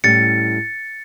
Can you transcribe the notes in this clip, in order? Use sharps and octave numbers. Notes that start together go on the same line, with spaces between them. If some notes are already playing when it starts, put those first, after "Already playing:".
A2 G3 C#4 A6 C#7